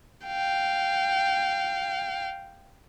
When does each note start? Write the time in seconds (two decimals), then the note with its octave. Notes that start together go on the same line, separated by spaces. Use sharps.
0.27 F5 G5